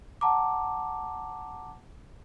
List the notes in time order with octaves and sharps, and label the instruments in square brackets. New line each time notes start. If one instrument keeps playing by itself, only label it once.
[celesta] F#5 A5 A#5 D6